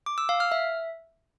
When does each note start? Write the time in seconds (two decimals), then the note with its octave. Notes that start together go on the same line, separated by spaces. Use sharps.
0.06 D6
0.18 E6
0.29 F5
0.40 F6
0.52 E5